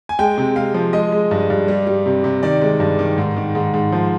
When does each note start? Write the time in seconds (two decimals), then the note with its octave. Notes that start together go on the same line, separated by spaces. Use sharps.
0.09 G#5
0.19 G#3 G5
0.38 C3
0.56 G#3 F5
0.74 F3
0.93 G#3 D#5
1.12 G#3
1.31 G2
1.50 G2
1.68 G3
1.87 G3
2.06 C3
2.24 C3
2.43 D#3 D5
2.61 G#3
2.80 G2
2.99 D#3
3.18 G#2
3.36 D#3
3.55 G#2
3.74 G#2
3.92 F3